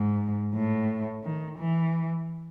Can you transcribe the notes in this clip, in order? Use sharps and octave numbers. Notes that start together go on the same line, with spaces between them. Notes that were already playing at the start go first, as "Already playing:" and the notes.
Already playing: G#2
A2
D#3
E3